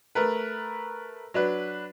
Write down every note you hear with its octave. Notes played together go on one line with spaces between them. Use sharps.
A3 A#4 B4
F#3 D4 B4